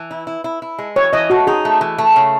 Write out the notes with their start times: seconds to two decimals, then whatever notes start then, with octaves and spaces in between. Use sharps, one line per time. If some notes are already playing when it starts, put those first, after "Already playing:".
Already playing: E3
0.11 E4
0.27 E4
0.44 E4
0.62 E4
0.78 G#3
0.96 E3 C#5
1.13 E3 D#5
1.30 A3 F#4
1.47 D#4 G#4
1.65 A3
1.81 E3
1.98 A3
2.16 C#3